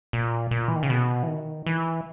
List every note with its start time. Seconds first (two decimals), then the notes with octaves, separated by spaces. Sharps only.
0.13 A#2
0.51 A#2
0.68 E3
0.76 D#3
0.83 C#3
0.90 B2
1.23 E3
1.28 D#3
1.66 E3